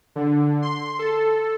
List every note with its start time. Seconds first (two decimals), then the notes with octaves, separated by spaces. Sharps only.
0.16 D3
0.62 C6
0.99 A4